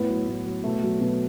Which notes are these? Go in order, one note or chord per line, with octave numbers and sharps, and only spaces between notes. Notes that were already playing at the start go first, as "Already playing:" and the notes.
Already playing: A2 B3
F#3
A2
F#3
B2 A3
F#3
B2